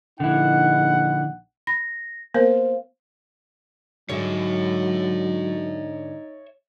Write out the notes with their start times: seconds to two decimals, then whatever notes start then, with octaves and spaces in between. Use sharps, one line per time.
0.20 A#1 D3 D#4 E4 F#5
1.67 B5 A#6
2.34 A#3 B3 A#4 C5 F5
4.09 G#2 D3 F#3 D#4 C#5 E5